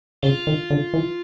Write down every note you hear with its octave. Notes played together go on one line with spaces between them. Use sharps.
C#3 F4
D#3
D3
E3